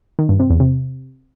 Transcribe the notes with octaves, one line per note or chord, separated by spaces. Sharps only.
D#3
G2
C3
E2
C3